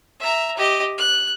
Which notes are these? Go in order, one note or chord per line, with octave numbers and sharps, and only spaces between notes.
E5 A#5
G4 D#5
F#6